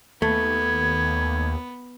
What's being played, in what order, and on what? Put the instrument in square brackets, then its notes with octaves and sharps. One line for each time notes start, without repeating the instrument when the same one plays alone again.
[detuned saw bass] D#2 [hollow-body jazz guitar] A3 [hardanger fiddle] B3 [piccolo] G#6